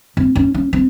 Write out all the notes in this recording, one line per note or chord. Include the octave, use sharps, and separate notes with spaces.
C4
C#4
C#4
C4